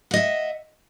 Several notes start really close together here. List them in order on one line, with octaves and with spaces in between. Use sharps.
F#5 D#5 E5